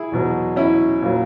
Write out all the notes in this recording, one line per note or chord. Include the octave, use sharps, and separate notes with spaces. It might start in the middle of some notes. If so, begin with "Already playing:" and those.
Already playing: E4 G#4
E2 B2 F#3
C#4 E4
A#2 F#3